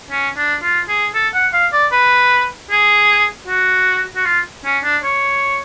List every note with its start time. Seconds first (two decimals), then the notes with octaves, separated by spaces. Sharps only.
0.11 C#4
0.37 D4
0.62 F4
0.88 G#4
1.15 A4
1.34 F#5
1.53 F5
1.73 D5
1.92 B4
2.70 G#4
3.48 F#4
4.16 F#4
4.25 F4
4.65 C#4
4.84 D4
5.03 C#5